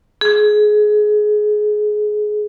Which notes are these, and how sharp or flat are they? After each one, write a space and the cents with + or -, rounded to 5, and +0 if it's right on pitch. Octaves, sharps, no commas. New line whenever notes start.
G#4 +20